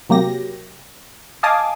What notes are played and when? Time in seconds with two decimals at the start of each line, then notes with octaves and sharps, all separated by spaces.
0.09 C3 F#3 A#3 G4 A#6
1.43 D#5 F5 G#5 A5 D6 D#6